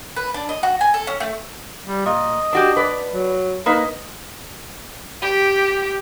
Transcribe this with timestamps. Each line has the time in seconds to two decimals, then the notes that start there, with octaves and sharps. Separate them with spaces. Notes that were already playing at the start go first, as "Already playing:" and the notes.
0.16 B4
0.34 D4
0.49 D#5
0.63 F#4
0.81 G#5
0.94 A4
1.07 C#4
1.20 A3
1.86 G3
2.06 A#2 D#5
2.53 D4 F#4 G4
2.76 B4 D5
3.13 F#3
3.66 A#3 D#4 B4 D#5
5.22 G4